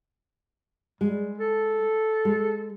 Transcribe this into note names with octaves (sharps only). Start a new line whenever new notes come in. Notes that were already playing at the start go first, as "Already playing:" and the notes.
G3 G#3
A4
G#3